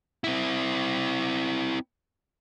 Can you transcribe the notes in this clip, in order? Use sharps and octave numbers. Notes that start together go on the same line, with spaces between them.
C4 E4